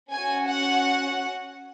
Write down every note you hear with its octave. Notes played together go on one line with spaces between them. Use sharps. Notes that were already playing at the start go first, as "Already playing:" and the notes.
C#4 F#4 G#5
F#5